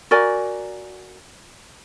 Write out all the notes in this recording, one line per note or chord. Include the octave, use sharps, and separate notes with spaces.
F#4 A#4 D5 G#5